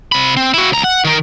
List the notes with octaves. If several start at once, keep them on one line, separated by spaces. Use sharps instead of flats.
C3 B5
C4
E4 F#4
C#2 A#5
F#5
D#3 A#4